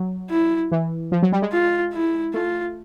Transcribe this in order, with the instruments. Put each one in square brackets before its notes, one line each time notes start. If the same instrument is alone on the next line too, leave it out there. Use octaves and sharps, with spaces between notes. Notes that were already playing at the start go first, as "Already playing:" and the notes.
Already playing: [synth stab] F#3
[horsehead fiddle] E4
[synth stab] E3
F3
F#3
G3
G#3
[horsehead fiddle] F4
E4
[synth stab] A3 [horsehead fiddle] F4